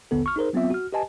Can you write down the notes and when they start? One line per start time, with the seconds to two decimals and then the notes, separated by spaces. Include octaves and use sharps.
0.11 A1 D#2 D3 B3 A4
0.24 G1 C#6 F6
0.36 D#4 G#4 A#4 C5
0.53 F#3 B3 C4 F4 E5
0.70 F#4 F6
0.93 G4 B4 D#5 G#5 A5